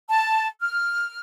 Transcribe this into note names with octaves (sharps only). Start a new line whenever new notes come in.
A5
F6